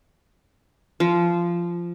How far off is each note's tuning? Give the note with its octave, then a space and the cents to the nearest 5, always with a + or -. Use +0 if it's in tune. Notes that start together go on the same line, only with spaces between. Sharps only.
F3 -15